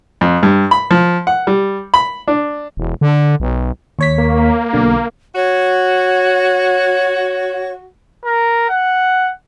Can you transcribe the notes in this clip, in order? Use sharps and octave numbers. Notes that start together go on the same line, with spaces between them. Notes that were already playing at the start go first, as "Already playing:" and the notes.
F2
G2
B5
F3
F#5
G3
B5
D4
E1
D3
B1
D#2 C#5 B6
A#3
B1 B2 D3
F#4 C#5
A#4
F#5